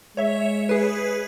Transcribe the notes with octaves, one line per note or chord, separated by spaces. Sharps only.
G#3 C#5 E5
G#4 B4